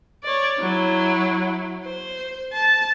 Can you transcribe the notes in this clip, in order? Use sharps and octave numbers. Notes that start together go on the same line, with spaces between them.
C#5 D5
F#3 E4
C5
A5